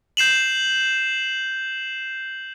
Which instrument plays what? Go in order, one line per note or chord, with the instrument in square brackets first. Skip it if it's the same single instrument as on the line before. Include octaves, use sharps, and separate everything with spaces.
[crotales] G6 C7 E7 F#7